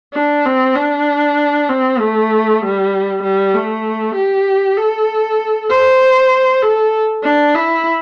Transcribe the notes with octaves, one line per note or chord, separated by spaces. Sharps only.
D4
C4
D4
C4
A3
G3
G3
A3
G4
A4
C5
A4
D4
E4